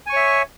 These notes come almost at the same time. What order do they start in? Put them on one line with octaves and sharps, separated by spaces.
G#5 C#6 C#5 E5